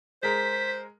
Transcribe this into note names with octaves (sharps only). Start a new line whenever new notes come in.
G#3 A#4 C5 B6